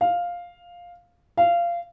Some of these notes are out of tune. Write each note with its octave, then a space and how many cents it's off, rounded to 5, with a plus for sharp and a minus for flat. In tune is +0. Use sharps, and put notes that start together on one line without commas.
F5 +5
F5 -20